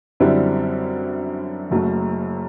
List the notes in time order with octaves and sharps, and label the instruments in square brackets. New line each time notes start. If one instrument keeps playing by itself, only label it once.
[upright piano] F#2 D3 G3 C4 E4
F#1 F#2 F#3 A3